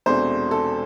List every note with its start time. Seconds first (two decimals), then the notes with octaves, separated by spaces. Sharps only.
0.06 E1 E2 C3 A3 D4 C5
0.51 A4